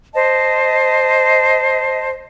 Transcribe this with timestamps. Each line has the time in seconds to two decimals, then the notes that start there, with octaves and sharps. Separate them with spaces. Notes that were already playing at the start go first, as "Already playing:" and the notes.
0.14 C5 D#5 A5